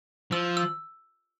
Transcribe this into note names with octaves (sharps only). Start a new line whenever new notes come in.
F3 E6
E6